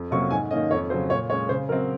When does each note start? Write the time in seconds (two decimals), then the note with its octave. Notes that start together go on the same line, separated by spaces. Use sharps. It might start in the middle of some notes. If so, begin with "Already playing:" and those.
Already playing: F2
0.11 C3 F#3 A#3 C#4 C#6
0.31 G#2 G#5
0.51 D#3 A#3 C#4 D#5
0.71 F2 C#5
0.90 C#3 F#3 C5
1.10 A#2 C#5
1.30 G#3 C#4 C#5
1.49 C#3 C5
1.69 F#3 C4 A#4